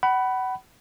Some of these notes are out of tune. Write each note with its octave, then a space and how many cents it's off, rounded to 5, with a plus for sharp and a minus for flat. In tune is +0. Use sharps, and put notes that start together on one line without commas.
F#5 +30 B5 +0